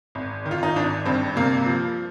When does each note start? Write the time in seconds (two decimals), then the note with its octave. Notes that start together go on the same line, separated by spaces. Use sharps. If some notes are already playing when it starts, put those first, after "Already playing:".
0.15 G#1
0.45 D#3
0.51 F4
0.63 D#4
0.76 G#1 D4
1.06 G2 C4
1.36 C3 A#3
1.66 F3